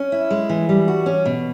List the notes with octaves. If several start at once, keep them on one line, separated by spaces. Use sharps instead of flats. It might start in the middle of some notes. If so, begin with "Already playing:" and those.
Already playing: C#4
E4
G#3
E3
G3
F#4
C#4
B2